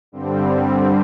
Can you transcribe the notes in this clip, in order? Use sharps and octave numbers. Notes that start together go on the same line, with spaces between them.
G2 D3 G3 C4